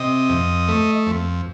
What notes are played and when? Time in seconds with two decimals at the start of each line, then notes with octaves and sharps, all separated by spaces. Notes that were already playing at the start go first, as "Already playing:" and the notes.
Already playing: C3 D#5
0.30 F2
0.68 A3
1.07 F2